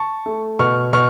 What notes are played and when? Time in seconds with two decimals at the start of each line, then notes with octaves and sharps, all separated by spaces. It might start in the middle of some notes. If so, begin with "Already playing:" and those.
Already playing: A5 C#6
0.26 A3
0.59 B2 C#6 F6
0.93 B2 C#6 F6